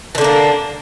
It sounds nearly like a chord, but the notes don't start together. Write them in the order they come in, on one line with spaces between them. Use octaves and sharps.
E3 D3 D4 A#3